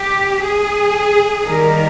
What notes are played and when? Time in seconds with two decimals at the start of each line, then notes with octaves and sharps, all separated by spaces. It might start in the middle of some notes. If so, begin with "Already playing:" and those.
Already playing: G4
0.43 G#4
1.47 D#3 G3 A#3 A#4